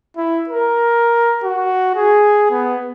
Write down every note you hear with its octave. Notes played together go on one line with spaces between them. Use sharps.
E4
A#4
F#4
G#4
B3